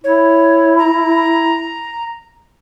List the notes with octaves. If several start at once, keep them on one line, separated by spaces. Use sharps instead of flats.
E4 C#5
A#5